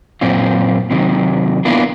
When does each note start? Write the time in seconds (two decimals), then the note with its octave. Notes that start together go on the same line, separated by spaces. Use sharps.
0.21 F#2 A#2 C4 F4
0.91 C3 D#3 F#3
1.65 A#3 B3 D4 E4 F4